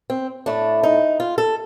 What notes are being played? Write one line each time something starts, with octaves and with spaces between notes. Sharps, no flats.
C4
A2 A3 D4
D#4
F4
A4